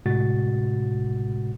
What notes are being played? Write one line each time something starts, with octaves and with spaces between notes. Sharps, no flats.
A2 C3 G#3 F#4 A6